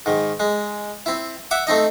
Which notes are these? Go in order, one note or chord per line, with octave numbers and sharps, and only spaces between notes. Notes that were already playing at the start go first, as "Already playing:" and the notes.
G#2 D#3
G#3
C4 E4
E5 F#5 D6
A3 C4 D#4 D#5